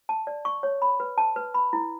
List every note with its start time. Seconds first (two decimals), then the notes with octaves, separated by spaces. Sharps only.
0.09 A5
0.27 D5
0.45 C#6
0.63 C#5
0.82 B5
1.00 B4
1.18 A5
1.36 B4
1.54 B5
1.73 E4